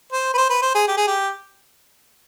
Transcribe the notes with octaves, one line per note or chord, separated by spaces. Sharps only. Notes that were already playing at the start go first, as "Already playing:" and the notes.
C5
B4
C5
B4
C5
G#4
G4
G#4
G4